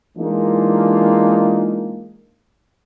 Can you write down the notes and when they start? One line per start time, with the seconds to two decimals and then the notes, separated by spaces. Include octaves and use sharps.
0.17 E3 G#3 A#3 D4 D#4 F4